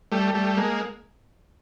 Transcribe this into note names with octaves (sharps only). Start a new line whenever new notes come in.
G3 A3
G3 A3
G#3 A#3